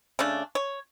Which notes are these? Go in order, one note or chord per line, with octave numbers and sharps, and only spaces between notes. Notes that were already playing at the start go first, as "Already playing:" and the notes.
C#3 A3 D4
C#5